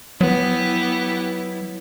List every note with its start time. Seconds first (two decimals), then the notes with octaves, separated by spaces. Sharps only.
0.21 F#3 B3 E4 G4